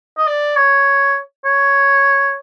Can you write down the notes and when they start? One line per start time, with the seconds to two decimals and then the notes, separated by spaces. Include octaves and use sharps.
0.18 D#5
0.27 D5
0.57 C#5
1.45 C#5